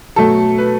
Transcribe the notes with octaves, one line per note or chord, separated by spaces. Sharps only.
B2 F#3 A3 A4
B4